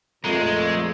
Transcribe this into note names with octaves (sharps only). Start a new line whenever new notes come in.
F2 A#2 G#3 A3 A#5